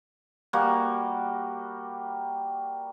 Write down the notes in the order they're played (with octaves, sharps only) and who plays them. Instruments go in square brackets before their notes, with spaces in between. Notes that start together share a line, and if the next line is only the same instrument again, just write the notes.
[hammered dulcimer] G3 A#3 F#4